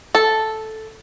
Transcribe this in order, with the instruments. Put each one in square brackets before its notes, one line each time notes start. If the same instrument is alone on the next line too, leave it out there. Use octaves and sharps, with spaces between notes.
[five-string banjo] A4